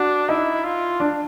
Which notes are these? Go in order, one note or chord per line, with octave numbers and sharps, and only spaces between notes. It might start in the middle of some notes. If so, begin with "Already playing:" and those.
Already playing: D4 F#4
D#4 E4
F4
D4